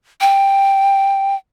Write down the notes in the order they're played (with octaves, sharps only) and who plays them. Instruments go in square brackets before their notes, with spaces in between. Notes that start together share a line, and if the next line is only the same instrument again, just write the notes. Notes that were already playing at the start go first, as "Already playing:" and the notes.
[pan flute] G5